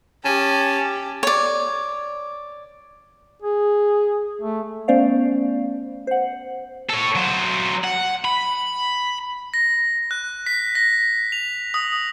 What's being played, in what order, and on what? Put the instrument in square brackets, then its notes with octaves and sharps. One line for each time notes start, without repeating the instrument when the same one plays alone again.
[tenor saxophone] C#4 [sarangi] G4 [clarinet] A5
[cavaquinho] C#5 D5
[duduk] G#4
A3
[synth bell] A3 B3 C#4 C5 D5 F5
C5 F#5
[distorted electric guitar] A4 C#5
F#3 C5
F#5
B5
[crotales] A#6
F#6
B6
A#6
F7
D#6